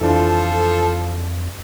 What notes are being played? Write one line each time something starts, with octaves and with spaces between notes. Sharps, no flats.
F2 E3 F3 D4 F4 A4